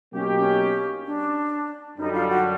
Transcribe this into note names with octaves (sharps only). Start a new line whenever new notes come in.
B2 F#3 A#3 C#4 D#4 G4
C#4
D4
F#2 D3 G3 D#4
F4
F#4